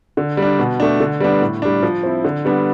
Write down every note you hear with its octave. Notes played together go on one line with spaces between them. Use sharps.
D3
G3
D4
B2
A3 D4
D3
G3 B3 D4
A2
G3 D4
F3
C4 E4
D3
G3 B3 D4